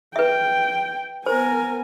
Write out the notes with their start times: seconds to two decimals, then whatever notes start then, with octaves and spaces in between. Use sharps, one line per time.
0.16 B4 E5 G5
1.26 B3 A#4 C5 G#5